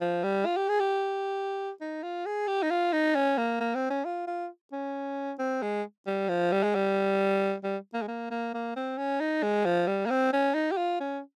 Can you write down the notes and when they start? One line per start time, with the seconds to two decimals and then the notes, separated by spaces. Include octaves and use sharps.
0.01 F3
0.23 G3
0.46 F4
0.57 G4
0.69 G#4
0.80 G4
1.81 D#4
2.03 F4
2.26 G#4
2.48 G4
2.63 D#4
2.71 F4
2.93 D#4
3.15 C#4
3.38 A#3
3.60 A#3
3.75 C4
3.90 C#4
4.05 F4
4.27 F4
4.72 C#4
5.39 C4
5.62 G#3
6.07 G3
6.29 F3
6.52 G3
6.63 G#3
6.75 G3
7.64 G3
7.94 A#3
8.02 G#3
8.08 A#3
8.31 A#3
8.54 A#3
8.76 C4
8.98 C#4
9.20 D#4
9.43 G#3
9.66 F3
9.87 G3
10.06 A#3
10.10 C4
10.33 C#4
10.54 D#4
10.71 G4
10.77 F4
11.00 C#4